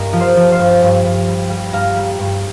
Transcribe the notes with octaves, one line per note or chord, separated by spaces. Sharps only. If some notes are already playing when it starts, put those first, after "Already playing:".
Already playing: G2 A#4 D#5
F3
C5 F5
F3
C5 F5
G2
G2
G2
G3
G3
G2 F5 A#5
G3
G2